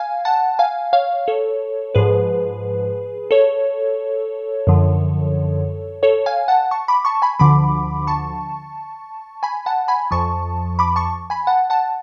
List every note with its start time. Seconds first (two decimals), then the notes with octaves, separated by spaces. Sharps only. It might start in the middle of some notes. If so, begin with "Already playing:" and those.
Already playing: F5 G#5
0.25 F#5 A5
0.59 F5 G#5
0.93 C#5 F5
1.28 A4 C#5
1.95 G#2 F3 G#4 B4
3.31 A4 C#5
4.67 F#2 D3 F3
6.03 A4 C#5
6.26 F5 G#5
6.48 F#5 A5
6.71 A5 C#6
6.88 B5 D6
7.05 A5 C#6
7.22 G#5 B5
7.39 D2 D3 F3 B5 D6
8.07 A5 C#6
9.43 G#5 B5
9.66 F#5 A5
9.88 G#5 B5
10.11 F2 F3 A5 C#6
10.79 B5 D6
10.96 A5 C#6
11.30 G#5 B5
11.47 F#5 A5
11.70 F#5 A5